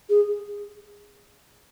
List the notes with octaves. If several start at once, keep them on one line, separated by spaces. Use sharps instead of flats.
G#4